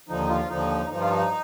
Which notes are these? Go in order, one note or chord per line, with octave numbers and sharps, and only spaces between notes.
D#2 D3 F3 D#4
F4
D#2 D3 F3 D#4
G2 F3 D#4
F4
D#4